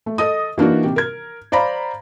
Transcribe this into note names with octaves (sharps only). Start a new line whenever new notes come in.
A3
A4 D#5 D#6
E3 A#3 D4 D#4 F#4
C3 G4
A#4 G#6
C5 D5 F5 A#5 B5